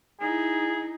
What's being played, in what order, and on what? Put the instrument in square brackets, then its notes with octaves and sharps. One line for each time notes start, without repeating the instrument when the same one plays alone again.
[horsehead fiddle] D#4 E4 [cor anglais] G#4